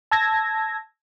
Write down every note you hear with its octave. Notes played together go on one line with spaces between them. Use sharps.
A5 E6 G#6 A#6